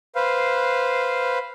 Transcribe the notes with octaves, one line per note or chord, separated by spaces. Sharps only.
B4 C5 F5